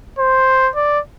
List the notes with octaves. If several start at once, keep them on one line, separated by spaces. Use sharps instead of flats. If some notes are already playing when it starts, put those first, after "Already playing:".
C5
D5